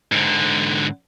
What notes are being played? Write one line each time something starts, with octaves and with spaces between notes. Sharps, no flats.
G#2 D3